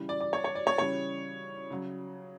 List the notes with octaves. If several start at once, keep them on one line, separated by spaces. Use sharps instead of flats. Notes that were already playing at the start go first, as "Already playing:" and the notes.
Already playing: C#3 E3 G3
D5
D5
C#5
C#5
D5
C#5
C#3 E3 G3 C#5
C#3 F#3